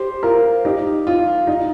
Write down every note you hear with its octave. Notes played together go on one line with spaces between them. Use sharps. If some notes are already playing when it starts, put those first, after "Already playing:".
Already playing: G4 C5
F4 A#4
D#4 G4
F4
D#4